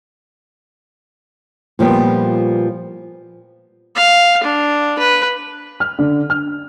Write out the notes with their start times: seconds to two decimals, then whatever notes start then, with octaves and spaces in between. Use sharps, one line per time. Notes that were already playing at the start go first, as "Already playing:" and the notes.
1.79 A#2 F3 G3 B3
3.95 F5
4.43 D4
4.99 B4
5.80 F6
5.99 D3
6.30 F6